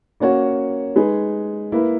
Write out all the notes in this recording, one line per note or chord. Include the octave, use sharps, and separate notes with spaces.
A#3 C#4 F#4 C#5
G#3 D#4 G#4 B4
A#3 E4 B4